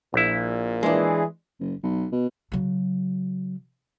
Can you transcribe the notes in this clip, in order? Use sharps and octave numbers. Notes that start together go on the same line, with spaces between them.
A#1 A#2 E4
E3 G#3 D4 G#4
F#1
B1
B2
C#3 F#3